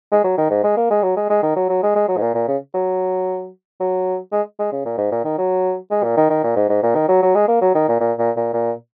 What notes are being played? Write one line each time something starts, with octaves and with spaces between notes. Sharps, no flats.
G#3
F#3
D#3
G#2
G#3
A#3
G#3
F#3
G#3
G#3
D#3
F#3
F#3
G#3
G#3
F#3
G#2
A#2
A#2
C#3
F#3
F#3
G#3
G#3
C#3
A#2
G#2
A#2
D#3
F#3
G#3
A#2
D#3
D#3
A#2
G#2
G#2
A#2
D#3
F#3
F#3
G#3
A#3
F#3
D#3
A#2
A#2
A#2
A#2
A#2